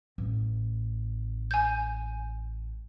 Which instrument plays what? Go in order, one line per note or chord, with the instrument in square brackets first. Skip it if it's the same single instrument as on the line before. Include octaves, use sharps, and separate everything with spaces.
[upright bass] A1
[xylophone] G#5 G6